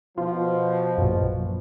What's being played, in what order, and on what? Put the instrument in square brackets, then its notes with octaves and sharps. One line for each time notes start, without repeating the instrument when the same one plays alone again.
[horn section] B2 F3 [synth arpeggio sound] F4
[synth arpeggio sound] A#1 F#2